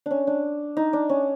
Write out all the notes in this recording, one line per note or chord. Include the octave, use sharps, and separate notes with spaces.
C#4 D4
D4
D#4
D4
C#4